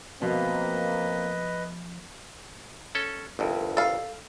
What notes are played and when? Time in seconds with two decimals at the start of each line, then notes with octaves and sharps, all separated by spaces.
0.22 B2 F3 A3 A#3 C4 B4 D#5
2.95 C#4 A4
3.39 G1 C2 F2
3.77 A4 F5